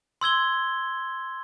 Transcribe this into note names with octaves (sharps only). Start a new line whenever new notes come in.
C6 E6 G#6 G7